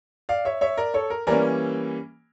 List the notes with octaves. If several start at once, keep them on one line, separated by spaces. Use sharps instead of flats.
D5 F5
C#5 E5
C#5 E5
A#4 D5
A4 C#5
A#4
E3 G3 A#3 C#4 A#4 D5